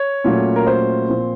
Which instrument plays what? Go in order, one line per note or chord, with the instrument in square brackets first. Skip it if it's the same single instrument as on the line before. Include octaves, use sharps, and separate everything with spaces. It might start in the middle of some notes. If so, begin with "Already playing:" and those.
Already playing: [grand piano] C#5
A#2 F#3 A3 C#4
A#4
C5
A#2 F3 C4